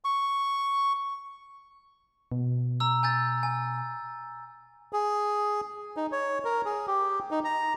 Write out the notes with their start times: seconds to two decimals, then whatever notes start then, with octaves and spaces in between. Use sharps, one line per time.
0.04 C#6
2.32 B2
2.80 A#5 E6
3.03 G#5 G6 A6
3.43 G#5
4.93 G#4
5.97 D#4
6.12 C#5
6.45 A#4
6.65 G#4
6.87 G4
7.31 D#4
7.45 A#5